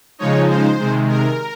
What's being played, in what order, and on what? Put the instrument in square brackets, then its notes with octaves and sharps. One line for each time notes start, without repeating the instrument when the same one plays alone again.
[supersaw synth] C#3 F3 G#3 D#4 C#5
C5
C3 D#3 G#3
A#4